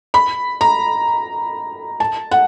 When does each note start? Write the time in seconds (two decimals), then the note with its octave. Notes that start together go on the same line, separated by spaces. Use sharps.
0.14 B5
0.61 A#5
2.00 A5
2.31 F#5